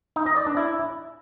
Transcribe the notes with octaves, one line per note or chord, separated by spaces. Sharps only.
D#4
D#5
D5
D4
E4